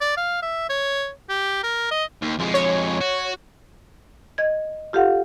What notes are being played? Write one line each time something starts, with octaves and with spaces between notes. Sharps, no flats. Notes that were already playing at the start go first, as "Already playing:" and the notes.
D5
F5
E5
C#5
G4
A#4
D#5
D#2
F2 G#3
C#5
F#4
D#5 G#6
F4 G4 A4 F5 F#5